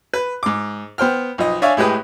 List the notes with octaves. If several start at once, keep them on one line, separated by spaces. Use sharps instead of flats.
B4
G#2 D6
B3 C5 G5 F6
B1 F3 D#5
D4 C#5 D5 E5 F5 G#5
A2 G#3 G4 B4 D#6